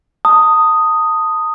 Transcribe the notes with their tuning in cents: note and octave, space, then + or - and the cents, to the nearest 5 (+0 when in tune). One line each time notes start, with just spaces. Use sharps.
A5 +40 D#6 +0